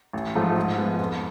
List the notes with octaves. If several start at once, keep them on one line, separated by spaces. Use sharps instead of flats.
A1
G#2 F3 A3
G#2
F3 G#3 B3
F2